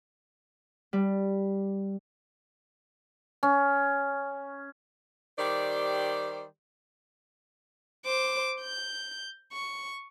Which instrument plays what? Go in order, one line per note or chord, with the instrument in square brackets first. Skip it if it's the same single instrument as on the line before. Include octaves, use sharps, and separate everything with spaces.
[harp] G3
[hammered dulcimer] C#4
[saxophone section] D#3 G3 G4 C5 D5
[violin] C5 D6
G6
C#6